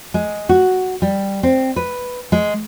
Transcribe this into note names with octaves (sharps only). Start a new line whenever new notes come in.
G#3
F#4
G3
C4
B4
G#3